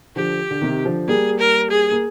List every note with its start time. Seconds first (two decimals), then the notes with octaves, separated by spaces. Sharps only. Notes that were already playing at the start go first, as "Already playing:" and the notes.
0.16 D3 F3 G4
0.51 D3
0.62 C3 D#3
0.85 D3 F3
1.08 G3 A#3 G#4
1.39 A#4
1.70 G#4
1.91 A#3